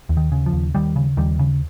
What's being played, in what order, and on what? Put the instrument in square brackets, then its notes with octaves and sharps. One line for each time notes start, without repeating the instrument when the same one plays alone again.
[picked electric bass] D#2
D#3
C#3
F3
D#2
D#2 D#3 G3
C#3
D#2 D#3 G3
C#3